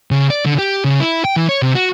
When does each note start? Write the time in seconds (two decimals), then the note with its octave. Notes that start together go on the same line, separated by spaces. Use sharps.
0.11 C#3
0.30 D5
0.46 D3
0.59 G4
0.84 C#3
1.00 E4
1.25 G5
1.36 E3
1.49 C#5
1.62 C3
1.75 F#4